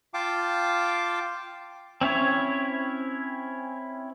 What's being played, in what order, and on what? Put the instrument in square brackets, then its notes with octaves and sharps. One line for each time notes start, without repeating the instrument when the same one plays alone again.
[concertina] F4 F5 G5 A5 D6
[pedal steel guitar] C4 C#4 E4 C#5